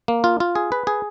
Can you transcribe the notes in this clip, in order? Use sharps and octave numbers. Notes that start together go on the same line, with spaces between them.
A#3
F4
F4
G#4
B4
G#4